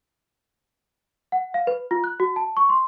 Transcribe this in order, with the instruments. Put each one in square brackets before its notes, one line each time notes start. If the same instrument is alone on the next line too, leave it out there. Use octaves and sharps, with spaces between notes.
[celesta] F#5
F5
B4
F4
F#6
F#4
A5
C#6
C6